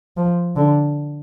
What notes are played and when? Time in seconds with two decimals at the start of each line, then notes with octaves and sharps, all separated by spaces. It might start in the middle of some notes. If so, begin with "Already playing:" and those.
0.17 F3
0.56 D3